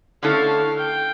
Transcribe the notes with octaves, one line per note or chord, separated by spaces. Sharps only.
D3 A3 C#4 E4 A4 F5
G5